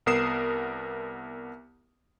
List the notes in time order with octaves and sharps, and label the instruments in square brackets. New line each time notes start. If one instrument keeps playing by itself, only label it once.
[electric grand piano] C2 B3 A#4 D#6 C7 E7